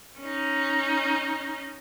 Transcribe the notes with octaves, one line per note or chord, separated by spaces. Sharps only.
C#4 D#4